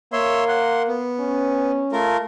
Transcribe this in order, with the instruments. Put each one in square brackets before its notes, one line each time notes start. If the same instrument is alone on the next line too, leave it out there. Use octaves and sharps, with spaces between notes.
[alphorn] A#3 [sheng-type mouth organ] C#5 E5 C6
[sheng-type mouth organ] F#5 C6
B3
[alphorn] C#4
[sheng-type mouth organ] A3 F4 A#4